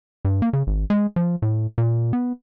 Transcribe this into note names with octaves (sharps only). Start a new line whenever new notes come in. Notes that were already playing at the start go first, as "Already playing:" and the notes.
G2
A#3
C#3
G#1
G#3
F3
A2
A#2
B3